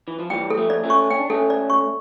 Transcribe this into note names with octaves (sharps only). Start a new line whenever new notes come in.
E3
F3
E3 G3 G5
A4
F3 A3
D5
A3 C#4
C#6
C#4 G5
D4
A3 C#4 A4
D5
C#6